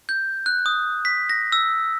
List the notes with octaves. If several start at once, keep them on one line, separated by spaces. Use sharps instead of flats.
G6
F#6
D#6
B6
A#6
E6